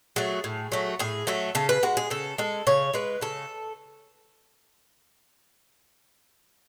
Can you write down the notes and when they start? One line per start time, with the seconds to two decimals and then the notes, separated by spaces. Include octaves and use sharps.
0.16 F#3 A3 G#4
0.44 A2
0.72 F#3 A3
0.99 A2 G#4
1.27 F#3 A3 A4
1.55 C#3 A4
1.69 B4
1.83 G#3 F#4
1.97 G#4
2.10 C#3 A4
2.38 G#3 A4
2.67 C#3 C#5
2.94 G#3 B4
3.21 C#3 A4